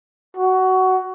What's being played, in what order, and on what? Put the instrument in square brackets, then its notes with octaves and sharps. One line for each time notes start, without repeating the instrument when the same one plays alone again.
[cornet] F#4